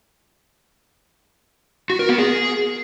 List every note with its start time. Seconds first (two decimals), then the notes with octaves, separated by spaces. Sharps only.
1.90 F#4
1.99 A#4
2.09 B3
2.18 G#4